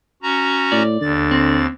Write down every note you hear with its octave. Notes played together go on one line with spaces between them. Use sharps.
C#4 F#4 A#5
A2 D5
D#2 D3 A6
C4